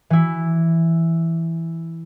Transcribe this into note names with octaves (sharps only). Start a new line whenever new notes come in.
E3 E4